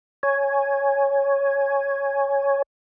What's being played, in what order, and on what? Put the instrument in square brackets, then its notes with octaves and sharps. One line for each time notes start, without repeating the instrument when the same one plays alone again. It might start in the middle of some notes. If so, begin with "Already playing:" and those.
[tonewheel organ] C#5 G#5